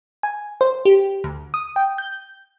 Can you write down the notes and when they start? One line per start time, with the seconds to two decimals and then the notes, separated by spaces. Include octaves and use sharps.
0.23 G#5
0.61 C5
0.85 G4
1.24 D2
1.54 D#6
1.76 G5
1.98 G6